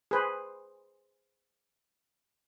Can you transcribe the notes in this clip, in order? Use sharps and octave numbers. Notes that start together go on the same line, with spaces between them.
G#4 B4 C5